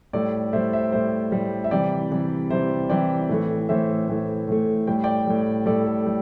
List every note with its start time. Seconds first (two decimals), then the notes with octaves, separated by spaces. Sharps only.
0.13 A2 G3 A4 D5
0.53 A2 C5 E5
0.56 G3
0.73 C5 E5
0.92 A2 G3 C5 E5
1.32 A2 G3
1.64 E5
1.71 C3 E3 G3 D5 G5
2.11 C3 E3 G3
2.50 C3 E3 G3 C5 E5
2.89 C3 E3 G3 D5 G5
3.29 A2 E3 A3
3.69 A2 E3 A3 C5 E5
4.08 A2 E3 A3
4.48 A2 E3 A3
4.87 A2 G3 G5
5.04 D5 G5
5.27 A2 G3
5.66 A2 G3 A4 D5
5.86 A4
6.06 G3